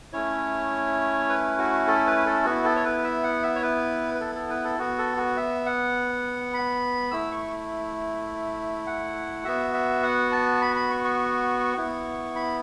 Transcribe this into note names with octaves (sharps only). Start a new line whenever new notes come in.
A3 C#4 E4 C#5
B4
F#4
A4
B4
A4
B3 E4 F#4
A4
C#5
B4
E5
F#5
E5
C#5
B4
B4
A4
A4
B4
A4
B3 F#4
A4
F#4
E5
F#5
B5
A3 E4 E6
C#6
F#5
B3 F#4 E5
E5
F#5
A5
B5
B5
C#6
C#6
B3 E4
B5